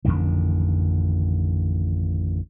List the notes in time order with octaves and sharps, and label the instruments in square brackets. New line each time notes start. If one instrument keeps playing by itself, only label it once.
[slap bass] A1 F2 D3 D#3